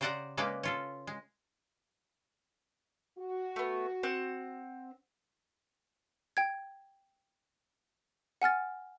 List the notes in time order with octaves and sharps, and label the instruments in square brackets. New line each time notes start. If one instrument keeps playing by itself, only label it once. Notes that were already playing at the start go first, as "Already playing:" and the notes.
[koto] C#3 G4 C5 D5 F#5 A#5
C#3 G#3 A#3 C#4 B4 D5
C#4 F4 A4
G#3
[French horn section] F#4
[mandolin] A3 B3
C4 F#5
[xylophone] G5 G#6
F#5 G#5 F6 A6